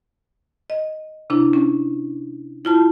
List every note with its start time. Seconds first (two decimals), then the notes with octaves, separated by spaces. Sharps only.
0.70 D#5
1.30 C3 D4 E4
1.53 C#4
2.65 E4 F4 A5